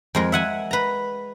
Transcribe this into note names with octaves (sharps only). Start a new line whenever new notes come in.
F2 G#3 A#4
E5 F#5 G#5
B4 A#5